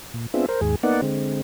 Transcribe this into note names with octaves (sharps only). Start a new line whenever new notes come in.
A#2
B3 C4 D4 F4 G#4 E5
A#4 C5
D#2 G#2 G#4
A#3 B3 D#4 D5 F#5
D3 G#3 C4